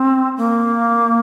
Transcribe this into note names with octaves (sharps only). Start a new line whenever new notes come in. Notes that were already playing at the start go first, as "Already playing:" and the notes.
Already playing: C4
A#3